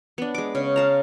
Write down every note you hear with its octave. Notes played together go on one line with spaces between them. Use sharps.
B3 D4
G#3 D6
C#3
F5 A5 A#5